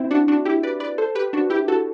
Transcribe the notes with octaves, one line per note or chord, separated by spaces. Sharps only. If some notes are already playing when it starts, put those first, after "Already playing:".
Already playing: C4 E4
D4 F#4
D4 F#4
E4 G4
B4 D5
B4 D5
A4 C5
G4 B4
D4 F#4
E4 G4
F#4 A4